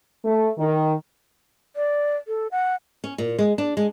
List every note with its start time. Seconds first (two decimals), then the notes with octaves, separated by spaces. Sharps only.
0.25 A3
0.58 D#3
1.76 D5
2.28 A4
2.51 F#5
3.04 C#4
3.18 A#2
3.39 G#3
3.58 D4
3.77 G#3